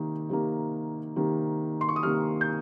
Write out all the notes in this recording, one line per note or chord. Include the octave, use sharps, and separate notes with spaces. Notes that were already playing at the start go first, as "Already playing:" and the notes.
Already playing: C3 D#3 A#3
C3 D#3 A#3
C3 D#3 A#3
C6
C#6
D#6
C3 D#3 A#3 F6
G6